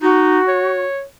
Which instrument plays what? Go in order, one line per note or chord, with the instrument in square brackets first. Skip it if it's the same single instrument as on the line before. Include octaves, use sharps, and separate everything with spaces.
[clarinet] D#4 [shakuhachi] F#4
[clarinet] C#5